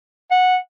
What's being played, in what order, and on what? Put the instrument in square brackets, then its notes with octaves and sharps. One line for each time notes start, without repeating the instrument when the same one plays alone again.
[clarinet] F#5